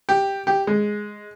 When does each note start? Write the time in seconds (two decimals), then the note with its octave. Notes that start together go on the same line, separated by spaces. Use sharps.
0.09 G4
0.47 G4
0.67 G#3